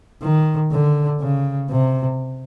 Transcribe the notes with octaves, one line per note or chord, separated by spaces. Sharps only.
D#3
D3
C#3
C3